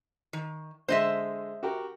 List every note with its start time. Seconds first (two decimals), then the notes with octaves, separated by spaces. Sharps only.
0.33 D#3
0.88 D3 G#3 C5 D#5 E5
1.63 F#4 G4 A#4